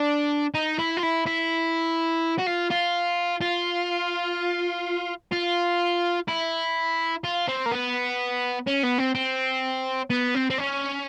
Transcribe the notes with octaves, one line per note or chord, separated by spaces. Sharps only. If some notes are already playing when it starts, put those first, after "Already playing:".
Already playing: D4
D#4
E4
F4
E4
E4
F#4
F4
F4
F4
F4
E4
F4
C4
A#3
B3
C#4
B3
C4
C4
B3
C4
C4
C#4